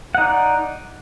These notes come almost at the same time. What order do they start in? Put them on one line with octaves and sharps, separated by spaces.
F#5 D#4 D5